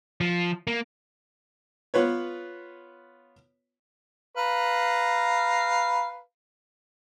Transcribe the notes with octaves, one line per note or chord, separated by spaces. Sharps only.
F3
A#3
B3 F4 B4 C#5
B4 F5 A#5